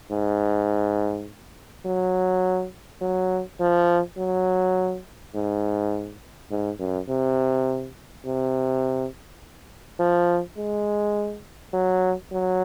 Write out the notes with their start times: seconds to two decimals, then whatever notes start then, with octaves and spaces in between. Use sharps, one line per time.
0.11 G#2
1.85 F#3
3.01 F#3
3.60 F3
4.17 F#3
5.35 G#2
6.50 G#2
6.79 F#2
7.09 C3
8.25 C3
10.00 F3
10.57 G#3
11.73 F#3
12.32 F#3